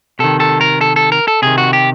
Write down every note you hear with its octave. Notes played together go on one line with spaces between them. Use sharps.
C3 D#3 A4
A4
A#4
A4
A4
A#4
A4
C3 D#3 G#4
F#4
G4